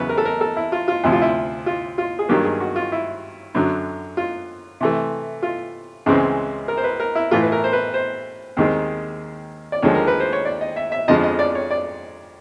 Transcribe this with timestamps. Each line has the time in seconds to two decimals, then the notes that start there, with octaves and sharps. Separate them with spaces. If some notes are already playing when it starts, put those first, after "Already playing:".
Already playing: E2 C#3 F#3 B3 B4
0.09 A#4
0.18 A4
0.25 A#4
0.41 A4
0.56 E4
0.72 F4
0.88 F4
1.04 D2 C3 F3 E4
1.12 F4
1.22 E4
1.66 F4
1.98 F4
2.19 G#4
2.29 G2 D#3 F#3 A#3 G4
2.44 G#4
2.60 F#4
2.76 F4
2.92 E4
3.55 F#2 D3 F#3
4.17 F4
4.81 C3 E3 A3
5.43 F4
6.06 C#2 C#3 E3 G#3 C4
6.68 A#4
6.77 C5
6.84 B4
7.00 A#4
7.15 E4
7.31 A2 E3 A3 F4
7.43 B4
7.52 A#4
7.64 C5
7.73 B4
7.94 C5
8.57 D#2 D#3 G#3 C4
9.72 D5
9.82 D#2 D3 F3 G#3 C#5
9.95 A#4
10.07 B4
10.20 C5
10.33 C#5
10.45 D5
10.61 D#5
10.76 E5
10.92 E5
11.08 F2 D3 F3 G#3 D#5
11.23 D#5
11.39 D5
11.55 C#5
11.71 D5